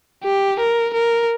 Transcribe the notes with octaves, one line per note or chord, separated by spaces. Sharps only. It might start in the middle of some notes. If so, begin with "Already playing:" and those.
G4
A#4
A#4